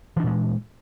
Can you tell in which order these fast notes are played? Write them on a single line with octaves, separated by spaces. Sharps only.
E3 D4 A#2 G#3